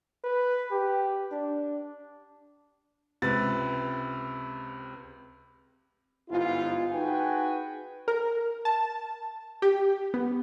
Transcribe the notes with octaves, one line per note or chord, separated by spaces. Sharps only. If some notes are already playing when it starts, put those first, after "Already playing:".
B4
G4
D4
C#2 C3 B4 A6
G1 G#2 B3 E4 F4
D#4 F#4 G#4 B4 G5 G#5
A#4
A5
G4
B3